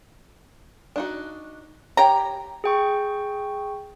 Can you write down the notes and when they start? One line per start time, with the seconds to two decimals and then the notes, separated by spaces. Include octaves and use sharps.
0.96 D4 D#4 F#4
1.97 G4 C#5 G5 A#5
2.64 G#4 G5 C#6